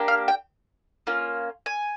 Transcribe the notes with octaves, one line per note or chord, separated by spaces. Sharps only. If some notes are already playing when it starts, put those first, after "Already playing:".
Already playing: A#3 D4 G4
F5
G5
A#3 C#4 F4
G#5